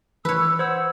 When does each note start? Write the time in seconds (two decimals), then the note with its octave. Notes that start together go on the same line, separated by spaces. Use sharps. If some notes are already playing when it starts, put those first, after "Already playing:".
0.25 E3 B4 C#5 E6
0.59 C5 F#5 E6 G#6